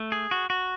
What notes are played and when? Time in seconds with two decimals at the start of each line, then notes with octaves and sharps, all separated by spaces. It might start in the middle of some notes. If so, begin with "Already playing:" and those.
Already playing: A3
0.12 G#4
0.31 F#4
0.50 F#4